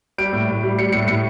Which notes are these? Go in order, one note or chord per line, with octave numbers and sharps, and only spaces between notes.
G3 D7
A2
A2
G3
G3 C#7
A2 C#7
A2 C#7